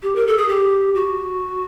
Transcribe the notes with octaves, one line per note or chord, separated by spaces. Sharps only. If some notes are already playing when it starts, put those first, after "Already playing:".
G4
A#4
A4
G#4
G4
F#4